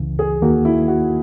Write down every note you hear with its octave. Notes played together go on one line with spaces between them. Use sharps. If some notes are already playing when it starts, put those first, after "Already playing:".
Already playing: C#2 C#3 E3
G#4
D#2 D#3 A#3 F#4
E4
F#4